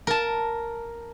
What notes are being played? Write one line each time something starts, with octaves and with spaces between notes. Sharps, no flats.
A#4 A5